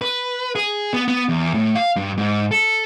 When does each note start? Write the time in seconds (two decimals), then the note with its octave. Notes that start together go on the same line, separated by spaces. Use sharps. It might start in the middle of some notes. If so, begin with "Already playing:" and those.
0.02 B4
0.56 G#4
0.94 B3
1.08 B3
1.29 E2
1.54 A2
1.75 F5
1.96 G2
2.18 G#2
2.51 A4